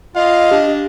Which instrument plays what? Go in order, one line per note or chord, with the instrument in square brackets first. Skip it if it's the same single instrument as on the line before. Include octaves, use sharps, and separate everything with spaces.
[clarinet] F4 [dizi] D#5 [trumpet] F5
[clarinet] D4 [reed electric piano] G4